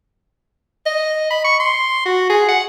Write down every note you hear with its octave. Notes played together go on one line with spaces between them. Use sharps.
D#5
B5
C#6
C6
F#4
G#4
F#5